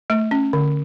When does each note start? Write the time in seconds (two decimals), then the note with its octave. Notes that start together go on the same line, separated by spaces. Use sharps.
0.10 A3
0.31 C#4
0.53 D3